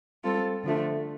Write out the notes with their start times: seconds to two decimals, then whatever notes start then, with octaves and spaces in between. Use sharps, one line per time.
0.24 G3 C4 F4 A4
0.64 D3 F3 A3 D4